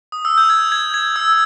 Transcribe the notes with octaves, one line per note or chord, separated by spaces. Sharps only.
D#6
E6
G6
G#6
G#6
G#6
E6